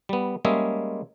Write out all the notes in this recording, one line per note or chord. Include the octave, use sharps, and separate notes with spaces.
G3 B3
G3 G#3 A#3 C#4 G#4 E5